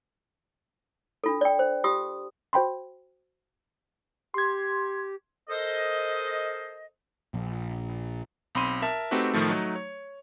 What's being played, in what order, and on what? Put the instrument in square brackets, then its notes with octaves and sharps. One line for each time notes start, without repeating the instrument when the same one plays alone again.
[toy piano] D4 F4 A4
D5 G5
C5
F4 G4 D#6
[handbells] F#4 C5 G5 B5 C6
[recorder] G4 [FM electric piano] C6 G#6
[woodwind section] A4 A#4 C5 D#5
[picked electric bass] A#1
[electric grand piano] B1 C4 B5 C6 D#7
A#4 E5 A5
A3 C4 D#4 F#4 G4 B4
A2 D#3 F3 A3
F#3 A3 D#4
C#5